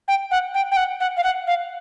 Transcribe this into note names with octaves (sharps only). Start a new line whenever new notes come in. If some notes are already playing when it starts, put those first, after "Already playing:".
G5
F#5
G5
G5
F#5
F#5
F5
F#5
F5